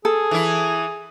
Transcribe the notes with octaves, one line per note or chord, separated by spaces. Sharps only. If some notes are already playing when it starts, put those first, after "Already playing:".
G#4 A4
E3 E4